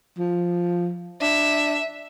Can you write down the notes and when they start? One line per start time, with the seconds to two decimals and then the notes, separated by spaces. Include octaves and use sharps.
0.18 F3
1.21 D4 E5